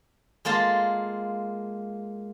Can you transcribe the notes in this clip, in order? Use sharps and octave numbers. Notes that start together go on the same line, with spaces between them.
G#3 A#3 F4 A5